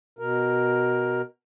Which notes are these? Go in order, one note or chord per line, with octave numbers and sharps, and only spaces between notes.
B2 A#4